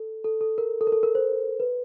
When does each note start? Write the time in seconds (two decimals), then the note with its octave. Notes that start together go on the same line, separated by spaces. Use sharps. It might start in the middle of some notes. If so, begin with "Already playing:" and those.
Already playing: A4
0.24 A4
0.41 A4
0.58 A#4
0.81 A4
0.87 A#4
0.92 A4
1.03 A#4
1.15 C5
1.60 B4